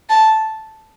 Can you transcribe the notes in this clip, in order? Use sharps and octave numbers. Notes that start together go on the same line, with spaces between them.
A5